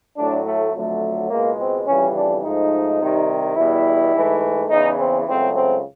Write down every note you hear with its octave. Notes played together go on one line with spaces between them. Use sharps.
A2 F#3 A3 D4
A3
F2 D3 F#3 A3
C#2 B2 G#3 A#3
C4
F2 C#3 E3 G3 C#4
D4
G#2 F3 A3 D#4
C2 C3 D#3 G3
E2 B2 G3 E4
G#2 E3 A3
E2 C#3 E3 D#4
C4
C#2 C#3 F#3 A3 C4
C4